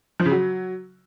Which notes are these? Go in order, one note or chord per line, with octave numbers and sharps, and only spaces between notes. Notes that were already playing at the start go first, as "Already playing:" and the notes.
F3
C#3
F#3